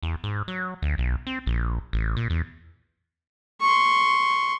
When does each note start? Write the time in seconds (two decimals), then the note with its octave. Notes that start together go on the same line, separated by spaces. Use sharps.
0.03 E2
0.24 G#2
0.48 F#3
0.82 D2
0.98 B1
1.27 C4
1.46 A#1
1.93 A1
2.17 A#2
2.30 E2
3.61 C6 C#6